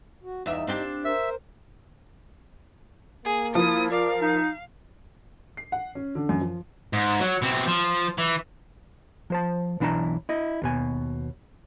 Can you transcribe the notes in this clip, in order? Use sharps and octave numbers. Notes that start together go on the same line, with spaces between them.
F#4
E2 D#4 E5
C4 D4 G4
A#4 C5 E5
A#3 G#4
F3 E4 D#6
A#4 D5 F5
D#4
C7
F#5
C#4
D3
F#2
F3
G#2
F#3
B2 C4
F3
E3
F3 C5 A5
B1 E3 D4 E4 A5 A#5
E4 D#5
D#2 B2 G#5